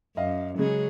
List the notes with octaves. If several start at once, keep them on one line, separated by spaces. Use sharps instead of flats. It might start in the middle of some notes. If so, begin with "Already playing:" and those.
F#2 D#5 F5
C#3 F#3 G#3 C#4 G#4